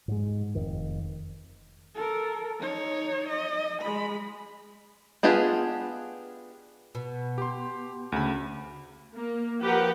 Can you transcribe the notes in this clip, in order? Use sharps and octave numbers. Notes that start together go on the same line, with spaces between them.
G#2 G#3
F1 F2 D#3
A4 A#4
D#4 C#5
D#5
G#3 B5
B3 D4 F4 G4 G#4
B2
G4 C6
D2 C#3 B5
A#3
F3 G4 A#4 B4 F#5